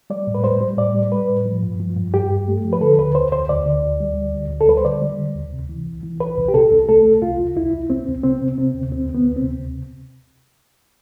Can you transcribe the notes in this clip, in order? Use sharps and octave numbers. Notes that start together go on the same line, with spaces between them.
G3 D5
A2
B4
G3 C5
G3
A2 D5
G3
G3 B4
A2
F3
G2
F3
G2
G2 G4
G2
A3
F3
B4
D3 A4
D2 B4
D2 C5
D2 C5
D2 D5
D3
D2
G3
D2
D2
D2
A4
G3 B4
C5
D3 D5
G3
D3
D2
C3
E3
C2
E3
C2 B4
C2
G4
C3 A4
C2
A3 A4
C2
C2 F4
C2
C2 E4
C2
C2 C4
C2
C3 C4
C3
C3 C4
D2
D2 C4
D2
B3
D2
C4
C3